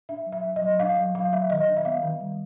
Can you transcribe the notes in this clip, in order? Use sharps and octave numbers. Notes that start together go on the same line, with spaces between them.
D4 E5
F#3
E5
F#3
D#5
F#3
D4 F5
F#3
F#3 F5
F#3 E5
D#3 D#5
D4
E5
B3 F5
D#3
G3